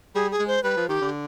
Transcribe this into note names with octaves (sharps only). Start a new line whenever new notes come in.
G3 G#4
G#4
G#3
C5
G3 B4
F3
D#3 G4
D3